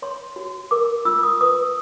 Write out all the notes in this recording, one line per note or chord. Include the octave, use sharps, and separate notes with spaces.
C#5 C6
F#4
A#4 D6
F4 E6
D#6
B4 D#6